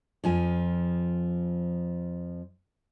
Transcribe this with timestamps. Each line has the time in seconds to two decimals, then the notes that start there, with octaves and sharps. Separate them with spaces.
0.24 F2 F3 G#5